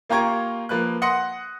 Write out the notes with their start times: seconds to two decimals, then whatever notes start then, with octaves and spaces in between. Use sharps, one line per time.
0.09 A#3 F4 G4 A#5 C#6 G#6
0.69 F3 A#3 B4 F#6
1.02 F#5 C6 D#6 A#6 C#7